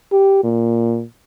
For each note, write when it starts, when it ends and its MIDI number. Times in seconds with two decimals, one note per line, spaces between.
0.12 0.40 67
0.44 1.03 46